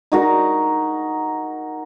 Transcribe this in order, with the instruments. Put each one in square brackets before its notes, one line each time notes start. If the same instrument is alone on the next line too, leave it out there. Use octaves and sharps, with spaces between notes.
[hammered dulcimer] D#4 F#4 A#4